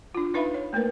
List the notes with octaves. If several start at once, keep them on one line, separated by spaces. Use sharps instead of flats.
D4 F4
D4 D#4 B4 E5 F5 B5
C#5
A3 A#3 A#4 B4